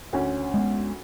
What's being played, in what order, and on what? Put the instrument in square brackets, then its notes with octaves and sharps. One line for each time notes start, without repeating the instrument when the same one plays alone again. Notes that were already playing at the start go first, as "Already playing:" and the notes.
[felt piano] D2 C#4
[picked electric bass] G#3 A#3 B3